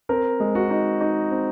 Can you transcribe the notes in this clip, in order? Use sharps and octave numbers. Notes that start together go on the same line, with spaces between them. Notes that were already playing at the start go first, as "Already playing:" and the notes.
C4 A#4
G#3
F#4
D#4
D#4
C4